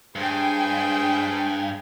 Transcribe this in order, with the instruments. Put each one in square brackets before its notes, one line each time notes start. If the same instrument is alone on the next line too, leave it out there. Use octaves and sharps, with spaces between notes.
[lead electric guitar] G2 [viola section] G#3 G5 G#5 [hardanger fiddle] G#4 C5